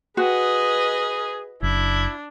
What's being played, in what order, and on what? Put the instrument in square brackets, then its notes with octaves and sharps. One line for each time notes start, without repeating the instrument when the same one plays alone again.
[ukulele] F#4 [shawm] G#4 [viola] B4 D#5
[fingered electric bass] F#1 [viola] D4 [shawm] E4